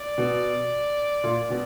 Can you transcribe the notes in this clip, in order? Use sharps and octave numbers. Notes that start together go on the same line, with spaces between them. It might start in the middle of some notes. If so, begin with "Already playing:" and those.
Already playing: D5
B2
A#2
B2